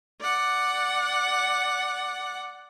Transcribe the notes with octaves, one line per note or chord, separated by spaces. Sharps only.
D5 F#5